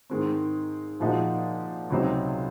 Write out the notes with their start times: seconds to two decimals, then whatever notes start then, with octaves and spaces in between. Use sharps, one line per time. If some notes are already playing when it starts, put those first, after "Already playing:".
0.10 G#2 D#3 G#3 C4
1.00 A#2 F3 G#3 D#4 F#4
1.90 C#2 C3 F#3 C4 D#4